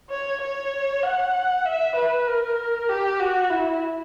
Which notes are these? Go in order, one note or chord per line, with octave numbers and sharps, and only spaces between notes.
C#5
C#5
F#5
E5
B4
A#4
G4
F#4
E4